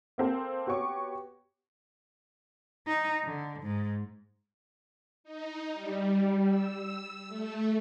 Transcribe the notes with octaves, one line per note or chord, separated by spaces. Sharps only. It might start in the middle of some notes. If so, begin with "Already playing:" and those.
A#3 C4 A4
B3 F#4 G4 C#5 C#6 D6
D#4
D3
G#2
D#4
G3
E6
A3